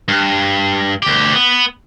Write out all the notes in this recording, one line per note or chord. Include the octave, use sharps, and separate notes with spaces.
G2
D2 G4
B3